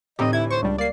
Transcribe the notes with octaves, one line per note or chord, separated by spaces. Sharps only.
D2 A2 E3 C4 D#4 G4 D#5
E4 G#6
C5 C#6
C#2 G3 D4
A#3 D5 C7